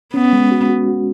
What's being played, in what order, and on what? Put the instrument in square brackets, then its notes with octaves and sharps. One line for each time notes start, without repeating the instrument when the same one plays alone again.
[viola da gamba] B3 [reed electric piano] C#4
[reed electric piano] G#3
F#4
F#4
F#4